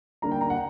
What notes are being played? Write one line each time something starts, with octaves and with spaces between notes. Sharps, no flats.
G2 D3 A#3 D4 A#5
G5
A#5
F#5